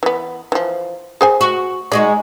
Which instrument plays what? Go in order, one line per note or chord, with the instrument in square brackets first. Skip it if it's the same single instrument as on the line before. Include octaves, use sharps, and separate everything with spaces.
[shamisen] E3 B3
E3 F3
G#4 C5 G#5
[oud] F#4
[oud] G#3 D#4 F#4 [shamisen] D5